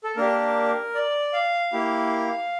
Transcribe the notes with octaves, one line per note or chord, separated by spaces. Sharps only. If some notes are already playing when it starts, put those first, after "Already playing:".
A4
A#3 D4 G4 A#4
D5
F5
A#3 E4 G4